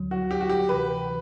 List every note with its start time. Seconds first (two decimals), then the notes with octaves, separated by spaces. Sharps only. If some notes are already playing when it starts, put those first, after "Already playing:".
Already playing: D2 D3 F#3
0.11 F#4
0.31 G4
0.41 F#4
0.49 G4
0.69 D2 C3 E3 B4